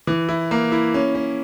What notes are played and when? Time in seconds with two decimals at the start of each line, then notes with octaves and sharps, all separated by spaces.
0.07 E3
0.29 E4
0.51 A#3
0.72 E4
0.94 C#4
1.15 C#4